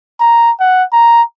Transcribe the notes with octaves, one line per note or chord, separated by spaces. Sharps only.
A#5
F#5
A#5